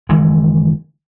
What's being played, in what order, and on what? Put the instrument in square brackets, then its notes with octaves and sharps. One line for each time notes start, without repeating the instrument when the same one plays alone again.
[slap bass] F#1 D#3 E3 G#3